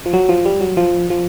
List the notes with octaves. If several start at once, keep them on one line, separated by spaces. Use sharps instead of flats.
F3
F#3
F3
G3
F#3
F3
F3